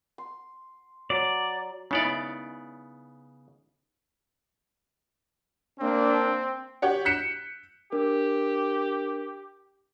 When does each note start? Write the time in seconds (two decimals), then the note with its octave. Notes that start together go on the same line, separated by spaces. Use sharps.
0.18 C6
1.10 F#3 D5 A#5
1.91 C#3 B3 C#4 D#4 E4 D5
5.80 A#3 C4 D4
6.82 G4 C#5 F#5
7.05 F#6 G6 B6 C#7 E7
7.92 D4 G4 A#4